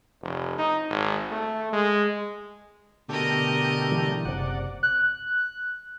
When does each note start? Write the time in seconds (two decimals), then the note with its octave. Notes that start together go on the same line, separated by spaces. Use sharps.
0.22 F1
0.58 D#4
0.90 G#1
1.32 A3
1.73 G#3
3.09 B2 D3 A3 G4 A#4 D#5
3.92 E3 G3
4.25 F#1 C3 D5 F#5
4.83 F#6